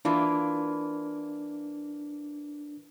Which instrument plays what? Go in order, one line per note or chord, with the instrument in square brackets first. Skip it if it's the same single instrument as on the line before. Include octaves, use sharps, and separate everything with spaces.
[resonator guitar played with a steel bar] E3 A#3 F4 [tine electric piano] D4